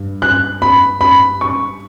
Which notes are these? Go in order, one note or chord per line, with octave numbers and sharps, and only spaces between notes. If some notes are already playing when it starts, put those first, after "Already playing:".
Already playing: G2
F#6
B5
B5
C#6